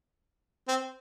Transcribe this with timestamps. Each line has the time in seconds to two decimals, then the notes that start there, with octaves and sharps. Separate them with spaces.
0.68 C4